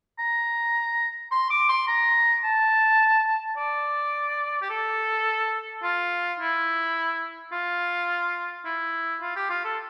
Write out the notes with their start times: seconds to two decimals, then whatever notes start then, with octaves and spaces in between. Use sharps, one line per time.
0.19 A#5
1.31 C6
1.50 D6
1.69 C6
1.88 A#5
2.44 A5
3.57 D5
4.62 G4
4.70 A4
5.83 F4
6.39 E4
7.52 F4
8.65 E4
9.21 F4
9.36 G4
9.50 F4
9.64 A4